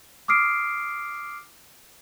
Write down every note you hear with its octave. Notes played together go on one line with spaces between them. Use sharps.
D6 D#6 F6 C7 D7